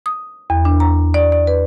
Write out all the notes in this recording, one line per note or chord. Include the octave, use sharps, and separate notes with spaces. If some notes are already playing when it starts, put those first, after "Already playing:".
D#6
E2
D4
A#5
D5
D5
B4